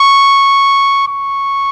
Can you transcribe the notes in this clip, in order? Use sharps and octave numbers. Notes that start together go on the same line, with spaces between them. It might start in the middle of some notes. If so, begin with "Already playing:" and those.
Already playing: C#6
C#6